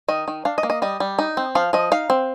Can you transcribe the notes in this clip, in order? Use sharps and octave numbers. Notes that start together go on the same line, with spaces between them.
D#3 D#5
D#3
D4 F5
D#5
A#3
D#5
G3 D#5
G3
D#4
C4
F3 F5
F3 D#5
D#4 F5
C4